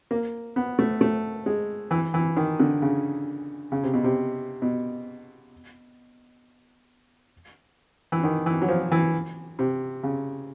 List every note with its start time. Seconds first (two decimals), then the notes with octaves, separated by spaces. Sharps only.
0.11 A#3
0.56 B3
0.79 A3
1.01 A3
1.46 G#3
1.91 E3
2.14 E3
2.36 D#3
2.60 D3
2.82 C#3
3.72 C#3
3.83 C3
3.93 B2
4.04 C3
4.62 B2
8.12 E3
8.24 D#3
8.46 E3
8.62 F#3
8.68 F3
8.92 E3
9.59 C3
10.03 C#3